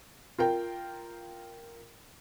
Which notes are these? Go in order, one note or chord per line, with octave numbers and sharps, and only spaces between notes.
F4 A#4 G5